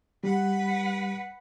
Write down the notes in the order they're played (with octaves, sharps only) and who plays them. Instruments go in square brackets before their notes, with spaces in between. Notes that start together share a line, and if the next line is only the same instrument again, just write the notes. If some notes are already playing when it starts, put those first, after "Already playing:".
[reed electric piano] G3 [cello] B4 F#5